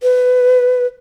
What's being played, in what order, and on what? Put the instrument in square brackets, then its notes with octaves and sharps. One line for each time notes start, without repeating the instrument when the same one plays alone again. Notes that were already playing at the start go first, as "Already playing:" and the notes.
[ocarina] B4